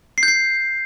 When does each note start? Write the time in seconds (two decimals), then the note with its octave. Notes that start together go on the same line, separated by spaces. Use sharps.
0.18 C7
0.23 G6
0.28 C7